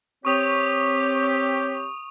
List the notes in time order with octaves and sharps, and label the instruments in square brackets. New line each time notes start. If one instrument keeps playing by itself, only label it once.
[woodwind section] C4 G4 [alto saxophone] C#5 [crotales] C#6 D#6 F7